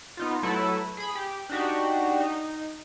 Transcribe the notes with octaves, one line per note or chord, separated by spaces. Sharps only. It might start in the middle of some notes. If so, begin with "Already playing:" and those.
B3 D#4 F4
F#3 A3 E4 A4 B4
G#4 B5
G4
D4 D#4 F#4 G4
D#4